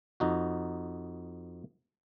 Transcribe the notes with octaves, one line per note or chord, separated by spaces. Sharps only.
F2 D#4 F#4